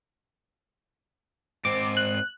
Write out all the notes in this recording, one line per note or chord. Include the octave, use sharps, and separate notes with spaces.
G#2 C4 D6
F#6